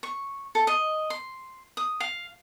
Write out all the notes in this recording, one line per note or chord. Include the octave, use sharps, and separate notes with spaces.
C#6
A4
D#5
C6
D#6
F5